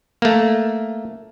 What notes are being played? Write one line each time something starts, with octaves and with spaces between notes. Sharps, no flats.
A3 A#3